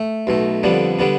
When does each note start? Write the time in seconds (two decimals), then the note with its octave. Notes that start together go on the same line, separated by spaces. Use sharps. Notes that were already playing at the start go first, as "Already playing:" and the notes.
Already playing: A3
0.27 B1 B2 A3
0.63 F2 D3 G3 B3 D4
0.99 D3 G3 B3 D4